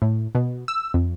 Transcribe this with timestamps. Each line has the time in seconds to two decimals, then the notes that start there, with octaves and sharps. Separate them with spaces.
0.02 A2
0.35 B2
0.68 E6
0.94 F2